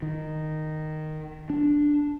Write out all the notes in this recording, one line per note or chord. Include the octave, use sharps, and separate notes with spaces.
D#3
D4